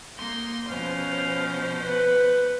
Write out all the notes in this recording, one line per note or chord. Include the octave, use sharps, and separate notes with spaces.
A#3 D#4 C6
B2 F3 C#4 C5 F5
B4 F#5